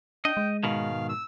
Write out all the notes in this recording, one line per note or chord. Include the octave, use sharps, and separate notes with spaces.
D4 D#5 G5
G#3
G#2 B2 D#3 F5
E6